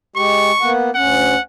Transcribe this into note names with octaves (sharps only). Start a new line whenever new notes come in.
G#3 G4 C#6
A#3 B3 F#5
D2 C#4 F#5